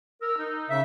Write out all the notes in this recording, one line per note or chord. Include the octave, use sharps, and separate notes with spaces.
A#4 E6
D#4
C#3 E5